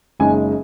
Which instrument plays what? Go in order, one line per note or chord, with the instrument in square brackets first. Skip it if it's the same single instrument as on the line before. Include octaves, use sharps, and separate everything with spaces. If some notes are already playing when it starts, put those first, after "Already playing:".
[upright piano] F#1 F#2 C#3 G#3 D#4 G#5